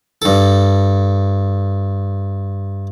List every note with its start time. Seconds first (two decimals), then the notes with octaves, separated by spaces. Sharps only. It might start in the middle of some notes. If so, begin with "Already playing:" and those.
0.22 G2 A4